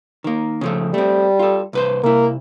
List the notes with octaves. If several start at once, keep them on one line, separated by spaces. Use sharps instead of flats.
D#3 A#3
C#3 F3 A3
G3 A3 C4
F4 A4
C2 B4 C5
C3 A#3 E4